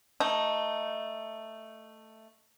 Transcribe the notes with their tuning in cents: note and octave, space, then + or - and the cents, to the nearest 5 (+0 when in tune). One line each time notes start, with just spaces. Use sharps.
A3 +10 D#4 +0